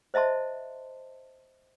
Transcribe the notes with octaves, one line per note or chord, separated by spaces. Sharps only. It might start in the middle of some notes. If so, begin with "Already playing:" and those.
C5 D#5 E5 A5 C6